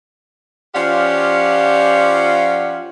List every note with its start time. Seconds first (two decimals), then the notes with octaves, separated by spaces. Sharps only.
0.75 F3 C#4 F4 G4 D5 F#5